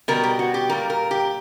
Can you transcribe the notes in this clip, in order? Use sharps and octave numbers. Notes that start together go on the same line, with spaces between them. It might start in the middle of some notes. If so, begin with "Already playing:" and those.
B2 G3 A#4
G4
F#4
G4
A#2 G3 A#4
A#4
G4